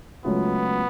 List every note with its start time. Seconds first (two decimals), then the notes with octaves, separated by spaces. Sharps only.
0.25 C#2 C#3 F#3 A3 B3 F4